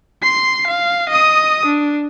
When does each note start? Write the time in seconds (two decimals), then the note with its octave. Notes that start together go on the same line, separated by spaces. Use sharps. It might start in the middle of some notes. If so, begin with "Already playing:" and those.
0.23 C6 C7
0.68 F5
1.10 D#5 D#6
1.66 D4